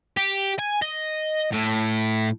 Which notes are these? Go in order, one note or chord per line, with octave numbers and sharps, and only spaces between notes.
G4
G#5
D#5
A2